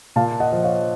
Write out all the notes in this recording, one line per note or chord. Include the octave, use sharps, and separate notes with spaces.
A#2 F5 A5
D#5 F#5
F3
C#5 F5